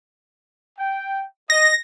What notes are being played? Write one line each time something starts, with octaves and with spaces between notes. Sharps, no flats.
G5
D#5 A#6